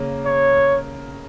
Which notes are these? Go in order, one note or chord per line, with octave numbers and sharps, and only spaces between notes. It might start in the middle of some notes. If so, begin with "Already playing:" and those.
Already playing: C#3 A#3 C#4
C#5